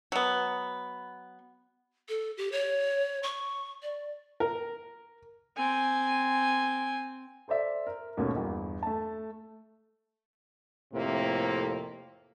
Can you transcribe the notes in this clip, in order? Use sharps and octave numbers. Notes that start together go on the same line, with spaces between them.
F#3 B3
A4
G4
C#5
C#6
D5
A#4
C4 G#5
A4 C5 D5 E5
A#4
D#2 G#2 B2 A3 A#3 C#4
G1 E2
A3 A5
F2 A2 C3 A#3